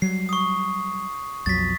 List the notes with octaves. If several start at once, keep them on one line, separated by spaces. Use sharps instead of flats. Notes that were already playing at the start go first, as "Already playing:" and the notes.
F#3 G3 C7
C#6 D#6
B1 F2 F#3 A6 B6